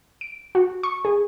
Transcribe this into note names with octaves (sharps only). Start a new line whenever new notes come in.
D7
F#4
C#6
G#4